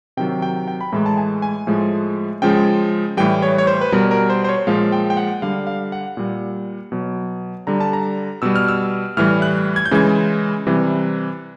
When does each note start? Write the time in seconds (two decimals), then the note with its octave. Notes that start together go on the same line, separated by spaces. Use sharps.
0.17 C3 D#3 F#3 G5
0.42 G5
0.68 G5
0.81 B5
0.92 A2 E3 G#3 A#5
1.06 A5
1.17 G#5
1.42 G#5
1.67 A2 F3 G#3
2.42 C#3 F3 G#3 G5
3.17 A2 E3 G3 G5
3.42 C#5
3.58 C#5
3.67 C5
3.81 B4
3.92 B2 G3 A#4
4.11 A#4
4.30 C5
4.44 C5
4.49 C#5
4.67 A#2 F3 G#3 F5
4.92 G5
5.10 G5
5.17 F#5
5.42 D3 G3 F5
5.67 F5
5.92 F#5
6.17 A#2 G3
6.92 B2 F#3
7.67 D3 G3 A#5
7.80 A5
7.93 A#5
8.42 B2 G3 E6
8.56 F6
8.68 E6
9.17 A2 E3 G3 F6
9.42 F#6
9.76 G#6
9.86 G6
9.91 C#3 E3 G#3 G#6
10.66 C3 E3 G3